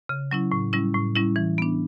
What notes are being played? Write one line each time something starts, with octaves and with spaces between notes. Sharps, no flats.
C#3
F#3 C#4 E4
A2
G3 C#4 E4
A2
G3 C#4 E4
E3
B3 D4